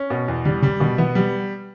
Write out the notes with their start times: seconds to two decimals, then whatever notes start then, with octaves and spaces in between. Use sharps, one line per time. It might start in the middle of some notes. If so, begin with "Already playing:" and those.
Already playing: C#4
0.10 B2
0.28 E2
0.45 D3 G3
0.63 C#3 G3
0.80 B2 D3
0.98 E3 B3
1.15 F#3 G3